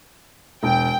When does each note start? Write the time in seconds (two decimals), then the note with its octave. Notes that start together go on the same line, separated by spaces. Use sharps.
0.63 E1 G5